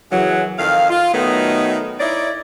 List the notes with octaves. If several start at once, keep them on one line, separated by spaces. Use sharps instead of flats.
F#2 C#3 E3 F#3
F2 D#3 F5
F4
D#3 F#3 A3 B3 D#4
D#4 E4 C#5 D5